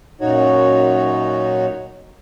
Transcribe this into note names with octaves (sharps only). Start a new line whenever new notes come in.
F#2 A#2 D#4 F#4 C#5